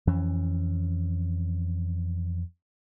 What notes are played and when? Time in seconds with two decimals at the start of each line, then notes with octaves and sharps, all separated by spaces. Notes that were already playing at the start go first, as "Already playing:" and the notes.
0.07 F2 E3 C#4